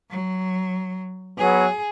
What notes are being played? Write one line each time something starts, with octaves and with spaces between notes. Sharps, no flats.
F#3
F#3 B3 G#4